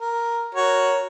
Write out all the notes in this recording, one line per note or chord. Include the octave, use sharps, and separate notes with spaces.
A#4
F#4 A#4 C#5